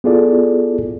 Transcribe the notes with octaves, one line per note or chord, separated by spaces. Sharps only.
B3 E4 F4 G#4 A4 D5